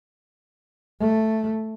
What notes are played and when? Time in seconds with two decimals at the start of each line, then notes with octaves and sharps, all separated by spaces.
1.00 A3